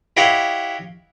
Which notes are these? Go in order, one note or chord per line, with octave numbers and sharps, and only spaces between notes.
E4 G4 C#5 D#5 F5 F#5